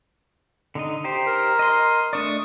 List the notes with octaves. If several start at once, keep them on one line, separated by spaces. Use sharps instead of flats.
D3 D#4 D#5
D#4 G4 C5
A#4
D#5 C6
A3 D4 D5 C#6 D#6